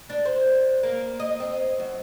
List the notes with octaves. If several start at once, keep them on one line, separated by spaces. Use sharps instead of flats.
D4
C5
A#3
D#5
C4
F#2